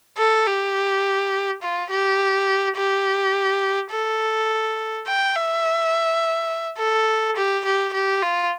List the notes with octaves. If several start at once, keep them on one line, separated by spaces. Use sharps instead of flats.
A4
G4
F4
G4
G4
A4
G5
E5
A4
G4
G4
G4
F4